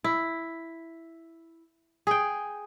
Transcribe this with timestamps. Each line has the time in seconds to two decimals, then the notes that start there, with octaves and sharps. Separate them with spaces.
0.04 E4
2.07 G#4 G5